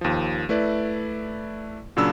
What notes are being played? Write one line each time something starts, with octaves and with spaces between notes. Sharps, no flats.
D#2 F3
A3 E4 B4 D5
A#2 C#3 F#3 D4 B5 E6